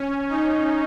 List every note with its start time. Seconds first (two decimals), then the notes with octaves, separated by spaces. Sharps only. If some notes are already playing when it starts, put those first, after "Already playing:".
Already playing: C#4
0.29 D#4